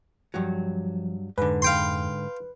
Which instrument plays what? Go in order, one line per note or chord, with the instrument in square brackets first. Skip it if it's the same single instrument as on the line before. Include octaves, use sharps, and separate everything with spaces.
[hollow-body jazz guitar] G2 F#3 [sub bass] F3
[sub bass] F2 [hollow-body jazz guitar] G#2 D3 [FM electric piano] B4
[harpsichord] F5 G5 C6